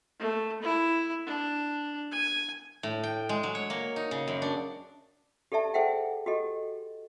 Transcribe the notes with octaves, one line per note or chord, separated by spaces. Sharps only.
A3
E4
D4
G#5
A2
G5
G#3
F#3
C#5
A#3
D#4
C#3
F#2
D4
G4 A4 D5 E5 A5
G#4 A4 C5 E5 F#5 G5
F#4 G4 A4 D#5